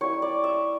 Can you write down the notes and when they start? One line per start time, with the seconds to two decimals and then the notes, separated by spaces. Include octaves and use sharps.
0.01 G3 A#3 E4 C#5
0.22 D5
0.44 E5